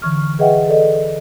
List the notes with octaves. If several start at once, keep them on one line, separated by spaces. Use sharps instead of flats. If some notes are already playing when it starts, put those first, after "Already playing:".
D3 E3 C#6 F6
G#4 B4 D#5 E5 F#5 G5
A4 D5 D#5